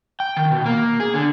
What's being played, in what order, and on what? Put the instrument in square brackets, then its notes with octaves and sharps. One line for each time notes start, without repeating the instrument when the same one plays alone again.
[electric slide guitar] G5
D#3
B2
A#3
G#4
D3